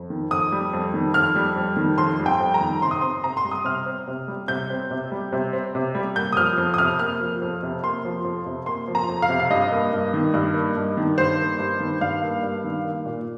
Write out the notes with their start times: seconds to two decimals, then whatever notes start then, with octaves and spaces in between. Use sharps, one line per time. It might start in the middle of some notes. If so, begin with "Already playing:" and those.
Already playing: F2
0.10 D#3
0.31 F2 D#6
0.52 G3
0.73 F2
0.94 D#3
1.14 F2 F6
1.36 G3
1.56 F2
1.77 D#3
1.98 F2 C6
2.19 G3
2.26 G5
2.40 F2
2.54 A#5
2.61 D#3
2.82 C3 C6
2.91 D#6
3.01 C4 C6
3.23 C3 A#5
3.37 C6
3.45 G3
3.51 D#6
3.65 C3 F6
3.86 C4
4.07 C3
4.28 G3
4.48 C3 G6
4.70 C4
4.91 C3
5.12 G3
5.32 C3
5.53 C4
5.75 C3
5.95 G3
6.16 A#3 G6
6.33 D#6
6.37 F3 F6
6.58 F2
6.74 D#6
6.78 C3 F6
6.99 A#3 F6
7.20 F3
7.42 F2
7.63 C3
7.83 A#3 C6
8.05 F3
8.25 F2
8.46 C3
8.66 A#3 C6
8.88 F3
8.95 A#5
9.08 F2
9.22 F5
9.29 C3
9.40 F5
9.50 G2 D#5
9.72 A#3
9.93 G2
10.14 D#3
10.34 G2
10.54 A#3
10.76 G2
10.97 D#3
11.18 G2 C5
11.39 A#3
11.59 G2
11.80 D#3
12.01 G2 F5
12.23 A#3
12.43 G2
12.64 D#3
12.85 A#3
13.06 A#2